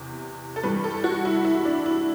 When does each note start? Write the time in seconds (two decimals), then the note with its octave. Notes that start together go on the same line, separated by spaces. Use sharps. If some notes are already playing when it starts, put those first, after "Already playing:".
Already playing: E2 C3 E3
0.56 A4
0.63 G2 E3 G3 B4
0.84 A4
1.04 F#4
1.25 E4
1.45 E4
1.65 D4
1.86 E4